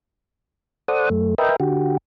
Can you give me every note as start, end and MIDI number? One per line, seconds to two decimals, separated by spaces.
0.88 1.09 69
0.88 1.09 72
0.88 1.09 74
0.88 1.09 78
0.88 1.09 87
1.10 1.34 42
1.10 1.34 57
1.38 1.56 70
1.38 1.56 71
1.38 1.56 75
1.38 1.56 76
1.38 1.56 79
1.60 1.97 50
1.60 1.97 66
1.60 1.97 67